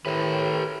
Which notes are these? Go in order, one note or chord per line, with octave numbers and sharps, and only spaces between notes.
A2 D#3 G4 A4 B4